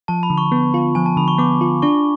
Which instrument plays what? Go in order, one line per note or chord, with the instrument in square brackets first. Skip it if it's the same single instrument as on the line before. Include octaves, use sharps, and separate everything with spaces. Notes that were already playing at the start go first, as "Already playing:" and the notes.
[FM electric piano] F3 [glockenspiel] A5
[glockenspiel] B5
[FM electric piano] D3
[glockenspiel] C#6
[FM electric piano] B3
F4
[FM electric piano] F3 [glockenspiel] G#5
[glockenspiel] A5
[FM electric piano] D3 [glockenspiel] B5
[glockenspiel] C#6
[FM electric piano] B3 [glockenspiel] D6
[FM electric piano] F4
[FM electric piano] D4 [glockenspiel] C#6